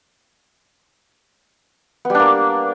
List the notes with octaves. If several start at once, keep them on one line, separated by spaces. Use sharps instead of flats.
G3 A#3 B3 D4